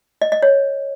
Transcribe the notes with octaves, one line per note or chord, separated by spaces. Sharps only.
D#5
D#5
C#5